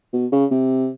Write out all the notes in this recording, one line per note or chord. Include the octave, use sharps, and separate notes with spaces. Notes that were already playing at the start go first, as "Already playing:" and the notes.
B2
C#3
C3